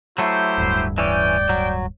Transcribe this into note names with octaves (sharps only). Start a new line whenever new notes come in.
F#3 A3 E4 G4 C5
D1 D2 G2
E3 C#4 D5 G5
F#3